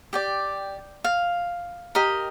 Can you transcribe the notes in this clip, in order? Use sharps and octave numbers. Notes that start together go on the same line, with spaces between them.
G4 D5 G5
F5
G4 A#4 D#5